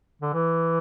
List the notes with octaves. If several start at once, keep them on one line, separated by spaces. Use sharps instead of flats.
D3
E3